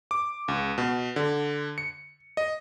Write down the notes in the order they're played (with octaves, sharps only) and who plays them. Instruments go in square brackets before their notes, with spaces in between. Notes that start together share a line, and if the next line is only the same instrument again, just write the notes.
[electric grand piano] D6
C#2
B2
D3
C#7
D#5